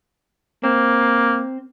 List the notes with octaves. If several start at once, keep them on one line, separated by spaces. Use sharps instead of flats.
A#3 C4